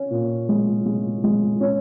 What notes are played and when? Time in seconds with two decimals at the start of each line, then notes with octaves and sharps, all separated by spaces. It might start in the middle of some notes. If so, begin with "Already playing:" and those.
Already playing: C#4
0.10 A#2
0.49 G#3
0.86 G#3
1.24 G#3
1.61 C#4